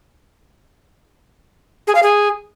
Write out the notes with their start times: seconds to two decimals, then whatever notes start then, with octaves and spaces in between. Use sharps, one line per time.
1.87 G#4
1.95 F5
2.03 G#4